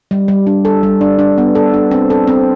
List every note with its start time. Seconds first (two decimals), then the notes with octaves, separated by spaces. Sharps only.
0.11 G3
0.28 G3
0.47 D4
0.65 A4
0.83 G3
1.01 D4
1.19 D4
1.38 B3
1.55 A4
1.74 D4
1.91 C4
2.10 A4
2.27 C4